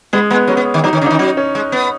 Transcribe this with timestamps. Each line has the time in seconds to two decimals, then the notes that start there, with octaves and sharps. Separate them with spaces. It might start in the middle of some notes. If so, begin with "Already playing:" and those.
0.13 G#3 B3
0.30 G#3 B3
0.48 F#3 C#4
0.57 B3
0.74 D#3
0.84 F#3 D#4
0.93 D#3 C#4
1.01 C#3
1.06 D#4
1.10 D#3
1.19 F#3 D#4
1.37 C#4
1.55 G#3
1.72 B3